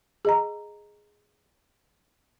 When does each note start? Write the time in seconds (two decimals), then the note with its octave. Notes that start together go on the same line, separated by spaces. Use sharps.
0.25 G#4 D#5 A#5